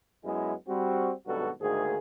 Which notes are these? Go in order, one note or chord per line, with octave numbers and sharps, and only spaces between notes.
F#2 G#3 B3 E4
G3 C4 F#4
G#1 G2 B2 F#3 F#4 A4
D2 G#2 D#3 A#3 G#4